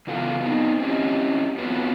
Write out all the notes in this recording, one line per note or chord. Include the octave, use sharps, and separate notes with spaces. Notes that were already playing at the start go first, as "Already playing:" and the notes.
C#3 E3 F#3 B3 F4 A4
B3 C4 D#4
C4 C#4 E4 G4 D#5
B3 C4 F4 F#4 B4 C#5